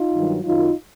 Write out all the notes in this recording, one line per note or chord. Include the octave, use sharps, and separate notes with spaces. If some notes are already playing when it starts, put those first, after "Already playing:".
Already playing: D#4 F4
G2 D#3 F#3
F#2 D#3 F#3 D#4 F4